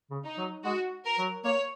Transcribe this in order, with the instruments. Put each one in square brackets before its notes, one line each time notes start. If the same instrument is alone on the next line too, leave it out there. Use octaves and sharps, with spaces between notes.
[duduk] C#3
[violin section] D#4
[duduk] F#3
[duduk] G#3 [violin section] F#4
[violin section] A#4
[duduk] F#3
[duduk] A#3 [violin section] C#5